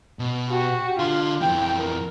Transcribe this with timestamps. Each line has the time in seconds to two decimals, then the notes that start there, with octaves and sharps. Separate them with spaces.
0.19 B2
0.50 F#4 G4
0.99 D3 F4 C6
1.41 F2 E3 G5
1.78 A#4